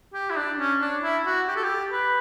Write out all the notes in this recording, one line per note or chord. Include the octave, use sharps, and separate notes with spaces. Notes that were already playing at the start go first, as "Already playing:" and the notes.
G4
E4
D4
C#4
D4
E4
F#4
G4
A4
G4
B4